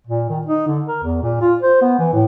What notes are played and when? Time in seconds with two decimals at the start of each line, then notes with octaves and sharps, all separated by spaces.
0.07 A#2
0.29 D#3
0.45 D#4
0.67 D3
0.87 A#4
1.03 E2
1.22 A#2
1.42 F4
1.62 C5
1.81 B3
1.99 E3
2.13 A2